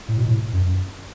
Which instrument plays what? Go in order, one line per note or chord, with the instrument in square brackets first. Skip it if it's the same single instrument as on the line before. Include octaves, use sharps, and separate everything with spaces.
[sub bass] A2
B2
A2
F#2